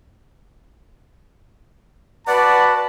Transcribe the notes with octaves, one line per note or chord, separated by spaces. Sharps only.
F#4 B4 D5 F#5 A5 B5 D6